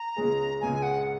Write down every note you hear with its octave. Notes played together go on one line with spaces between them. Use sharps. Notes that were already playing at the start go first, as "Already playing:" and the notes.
Already playing: A#5
C#2 C#3 G#3 C#4 G#4
C#2 C#3 G#3 C#4 G#4 G#5
F#5